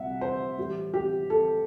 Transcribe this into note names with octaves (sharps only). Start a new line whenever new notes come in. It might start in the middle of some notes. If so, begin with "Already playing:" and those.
Already playing: C2 E5 F#5
C5
A2 E3 G3
G4
A4